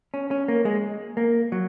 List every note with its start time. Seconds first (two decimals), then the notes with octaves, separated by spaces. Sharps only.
0.14 C#4
0.31 C#4
0.48 A#3
0.65 G#3
1.17 A#3
1.52 F#3